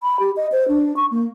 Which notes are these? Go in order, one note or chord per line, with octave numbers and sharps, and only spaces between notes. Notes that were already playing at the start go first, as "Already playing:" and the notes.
B5
G4
D#5
C5
D4
C#6
A#3